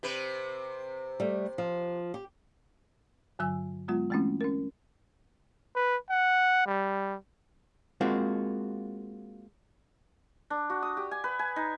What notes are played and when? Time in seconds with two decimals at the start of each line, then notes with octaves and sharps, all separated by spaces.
0.03 C3 C4 B4
1.20 G3 A3
1.58 F3
2.14 G4
3.39 G2 D3 F#3 G#5 E6
3.88 F#3 G#3 B3 F4
4.10 E3 G#3 A3 C4 C#4 E4
4.41 C#4 A#4
5.75 B4
6.10 F#5
6.66 G3
8.01 G#3 A#3 C4 F4 F#4
10.50 D4
10.70 F#4
10.82 D#6
10.97 G4
11.11 G#5
11.24 B4
11.39 G#5
11.56 D#4